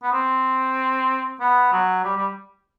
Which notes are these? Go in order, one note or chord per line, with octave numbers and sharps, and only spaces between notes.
B3
C4
B3
F#3
G3
G3